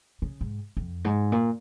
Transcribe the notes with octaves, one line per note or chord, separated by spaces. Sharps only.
C#3
G#2
F2
G#2
A#2